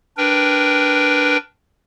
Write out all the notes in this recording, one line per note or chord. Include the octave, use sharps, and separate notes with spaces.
D4 A#4 B4 G5